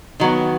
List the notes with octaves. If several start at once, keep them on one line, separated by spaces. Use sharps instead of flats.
D#3 F#3 B3